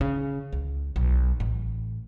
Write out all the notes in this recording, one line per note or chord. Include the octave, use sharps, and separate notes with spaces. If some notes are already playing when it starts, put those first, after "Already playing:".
C#3
C#2
B1
A1